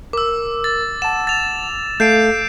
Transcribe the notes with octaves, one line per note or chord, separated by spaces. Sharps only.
A#4 D6 E6
A6
F#5 A5 E7
A6 F7
A3 A4 F5 G6 C7 D7